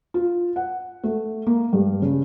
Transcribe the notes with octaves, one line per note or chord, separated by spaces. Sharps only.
F4
F#5
A3
A#3
G2
C#3